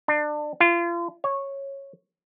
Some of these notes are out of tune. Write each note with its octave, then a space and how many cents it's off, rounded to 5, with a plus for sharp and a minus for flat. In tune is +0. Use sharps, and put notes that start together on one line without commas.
D4 +30
F4 -35
C#5 -10